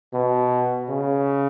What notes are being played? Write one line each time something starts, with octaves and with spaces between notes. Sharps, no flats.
B2
C#3